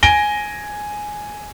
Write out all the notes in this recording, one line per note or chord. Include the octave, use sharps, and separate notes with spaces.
G#5 A#6 D7 G7